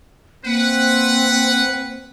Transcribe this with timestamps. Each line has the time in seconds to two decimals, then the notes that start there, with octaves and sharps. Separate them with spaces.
0.45 A#3 C4 B4 F#5